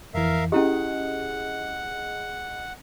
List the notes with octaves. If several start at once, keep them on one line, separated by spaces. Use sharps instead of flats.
F2 E3 A#4 E5 F5
C#4 E4 G4 G#4 D#5 F#5